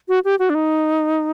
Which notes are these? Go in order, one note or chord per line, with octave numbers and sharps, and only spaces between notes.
F#4
G4
F#4
D4
D#4